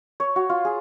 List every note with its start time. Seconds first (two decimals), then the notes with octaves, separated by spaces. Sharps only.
0.20 C#5
0.36 F#4
0.50 F4
0.65 G#4